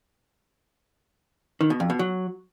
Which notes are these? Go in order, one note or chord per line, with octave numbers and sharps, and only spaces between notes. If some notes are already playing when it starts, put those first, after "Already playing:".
D#3
B2
F2
B2
F#3